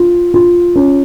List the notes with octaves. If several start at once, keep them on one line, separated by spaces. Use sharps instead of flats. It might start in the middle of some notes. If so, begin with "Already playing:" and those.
Already playing: F4
F4
C#4